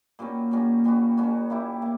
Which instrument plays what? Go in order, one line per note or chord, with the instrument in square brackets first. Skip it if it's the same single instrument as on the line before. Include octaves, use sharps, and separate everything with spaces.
[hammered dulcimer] A#2 G3 C#4 F#4
A#2 G3 C#4 F#4
A#2 G3 C#4 F#4
A#2 G3 C#4 F#4
A#3 E4 G4
A#3